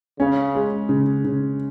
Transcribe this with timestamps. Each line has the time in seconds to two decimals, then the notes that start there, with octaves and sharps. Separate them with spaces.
0.20 C#3 C#4
0.55 G#3
0.89 C#3
1.25 C#3